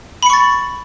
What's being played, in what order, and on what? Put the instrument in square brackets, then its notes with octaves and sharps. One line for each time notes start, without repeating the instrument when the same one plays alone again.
[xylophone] B5
C#7
C#6
A6